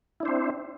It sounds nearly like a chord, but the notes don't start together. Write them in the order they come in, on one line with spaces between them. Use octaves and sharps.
E4 D4 C5 C4